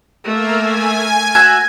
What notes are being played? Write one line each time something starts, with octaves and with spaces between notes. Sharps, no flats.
A3 A#3 A#4 E5
G#5
F#4 E5 G#5 G#6